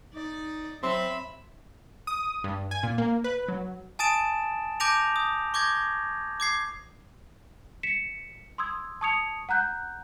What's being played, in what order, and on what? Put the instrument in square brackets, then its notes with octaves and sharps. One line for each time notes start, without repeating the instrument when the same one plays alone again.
[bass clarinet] D#4 [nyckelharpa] D5
[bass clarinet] F#3 [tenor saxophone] C4 [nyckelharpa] E5 B5
[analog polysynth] D#6
G2
G#5
A#2
A#3
B4
F#3
[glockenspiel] G#5 A5 D#6 A6 D7 E7
A5 D6 G6 A#6 D7 F7
D#6
C#6 D6 G6 G#6 A#6
D6 G#6 C7
[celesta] B6 C#7 E7
C6 D#6 E6 G#6
A5 C#6 D#6 G#6 C#7 F7
F#5 A#5 F#6 G6